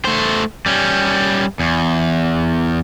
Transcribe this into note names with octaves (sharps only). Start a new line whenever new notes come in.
A3 C5
G3 C#4
E2